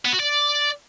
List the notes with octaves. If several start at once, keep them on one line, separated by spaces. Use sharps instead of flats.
B3
F#4
D5